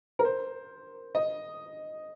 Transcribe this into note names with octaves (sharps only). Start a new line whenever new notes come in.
A#4
C5
D#5